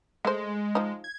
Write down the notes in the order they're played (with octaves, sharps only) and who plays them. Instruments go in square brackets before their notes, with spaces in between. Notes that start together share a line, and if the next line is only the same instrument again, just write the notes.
[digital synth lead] G#3 [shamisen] A3 C5
[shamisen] F3 D#4
[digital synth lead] G#6